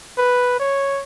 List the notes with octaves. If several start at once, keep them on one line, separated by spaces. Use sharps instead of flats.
B4
C#5